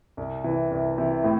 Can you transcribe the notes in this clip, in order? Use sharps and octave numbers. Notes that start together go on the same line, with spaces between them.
C2
C3 E3
C2
C3 E3
A2